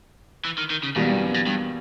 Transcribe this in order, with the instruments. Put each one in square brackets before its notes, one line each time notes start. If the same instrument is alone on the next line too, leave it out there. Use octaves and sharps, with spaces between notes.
[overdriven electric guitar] E3
D#3
D#3
C#3
[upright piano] E2 B2 G3 A#3 [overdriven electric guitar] G#2
[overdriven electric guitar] G2
F#2
G2
G2